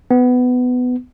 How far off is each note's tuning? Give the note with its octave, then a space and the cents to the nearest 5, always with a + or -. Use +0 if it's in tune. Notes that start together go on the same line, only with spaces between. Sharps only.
B3 +15